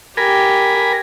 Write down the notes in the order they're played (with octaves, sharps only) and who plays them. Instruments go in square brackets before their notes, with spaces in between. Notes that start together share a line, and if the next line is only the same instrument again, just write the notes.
[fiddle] G4 [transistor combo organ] A#4 G#5 B5